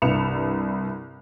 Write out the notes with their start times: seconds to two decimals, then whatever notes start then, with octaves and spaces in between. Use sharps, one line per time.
0.02 C2 G2 B4 C#7 E7 F7